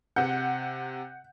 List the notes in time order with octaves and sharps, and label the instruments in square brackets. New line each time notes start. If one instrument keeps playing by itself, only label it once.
[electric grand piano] C3 G6 [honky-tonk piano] F#5